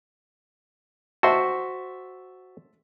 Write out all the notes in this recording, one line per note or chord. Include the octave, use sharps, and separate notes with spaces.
F#4 C5 E5 A5 C6